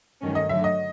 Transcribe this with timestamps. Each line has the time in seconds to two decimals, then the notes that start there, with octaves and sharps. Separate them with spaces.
0.21 G2 D#3 F#3 A3 C#4
0.35 D#5
0.49 D3 F#3 A3 E5
0.64 D#5